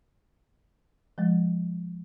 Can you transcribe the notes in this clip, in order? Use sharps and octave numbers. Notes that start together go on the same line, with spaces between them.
F3 G#3